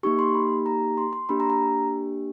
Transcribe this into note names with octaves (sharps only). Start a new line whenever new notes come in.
A#3 D#4 G4 C#6
C6
B5
A#5
C6
C6
A#3 D4 G4 B5
A#5
A#5